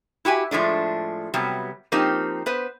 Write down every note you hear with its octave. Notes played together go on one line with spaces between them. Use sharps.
E4 F#4 G4 G#5
A2 F3 G#3 A3 D4
C3 F#3 G3 B3
F3 A#3 C4 D#4 G4
B3 B4 C5